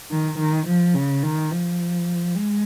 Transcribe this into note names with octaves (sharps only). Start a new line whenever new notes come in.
D#3
D#3
F3
C#3
D#3
F3
G#3